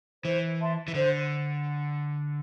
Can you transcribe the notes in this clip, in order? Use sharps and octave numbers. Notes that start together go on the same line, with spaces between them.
E3 C5
E5 A5 C6
E3
D3 C5